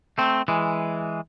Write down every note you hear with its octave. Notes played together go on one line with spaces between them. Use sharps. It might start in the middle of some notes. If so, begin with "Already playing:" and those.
A3 C4
E3 G#3